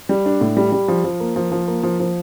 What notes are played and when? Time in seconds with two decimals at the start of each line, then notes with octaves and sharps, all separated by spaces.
0.09 G3
0.26 D4
0.41 A2
0.57 G3
0.72 G3
0.88 F3
1.04 F3
1.20 A#3
1.36 F3
1.52 F3
1.68 A#3
1.83 F3
2.00 F3